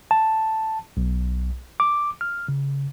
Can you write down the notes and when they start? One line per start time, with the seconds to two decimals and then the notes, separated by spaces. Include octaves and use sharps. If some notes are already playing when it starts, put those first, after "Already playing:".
0.11 A5
0.97 B1
1.80 D6
2.21 F6
2.48 C#3